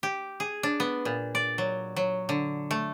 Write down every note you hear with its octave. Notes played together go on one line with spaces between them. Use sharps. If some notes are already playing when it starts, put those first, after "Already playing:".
G4
G#4
D4
B3
A#2
D5
F#3
F#3
D3
A3